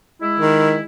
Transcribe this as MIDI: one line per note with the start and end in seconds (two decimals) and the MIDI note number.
0.22 0.84 56
0.22 0.84 64
0.40 0.76 51